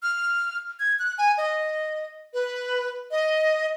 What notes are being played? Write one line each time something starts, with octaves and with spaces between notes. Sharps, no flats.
F6
G#6
F#6
G#5
D#5
B4
D#5